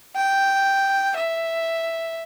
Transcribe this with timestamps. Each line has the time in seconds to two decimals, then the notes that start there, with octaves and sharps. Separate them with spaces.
0.16 G5
1.17 E5